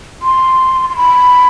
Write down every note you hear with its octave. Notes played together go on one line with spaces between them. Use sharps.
C6
C6
B5